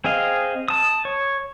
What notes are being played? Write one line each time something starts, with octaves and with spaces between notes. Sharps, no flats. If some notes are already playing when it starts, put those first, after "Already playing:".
C4 G#4 D#5 F5
A5 D#6
C#5